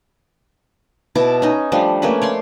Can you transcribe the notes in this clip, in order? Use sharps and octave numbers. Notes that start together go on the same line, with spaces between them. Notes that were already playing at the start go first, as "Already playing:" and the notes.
B2 E4 A5 D6
C#4 D#4
F3 G3 A3 D4
A3 A#3 C#4 B4
C#5 D5 C6